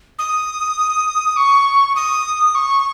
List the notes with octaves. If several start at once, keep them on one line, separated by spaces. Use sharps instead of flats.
D#6
C#6
D#6
C#6